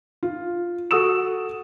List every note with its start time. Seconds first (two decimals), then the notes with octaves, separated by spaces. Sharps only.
0.23 F4
0.91 F#4 A4 D#6 E6 E7